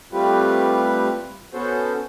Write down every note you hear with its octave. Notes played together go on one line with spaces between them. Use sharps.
G3 A3 C4 F4 G4 B4
B3 C#4 F#4 A4 C5